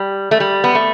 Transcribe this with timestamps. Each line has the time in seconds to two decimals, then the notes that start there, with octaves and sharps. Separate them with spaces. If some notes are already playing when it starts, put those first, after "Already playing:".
Already playing: G3
0.31 A3
0.40 G3
0.64 B3
0.75 A3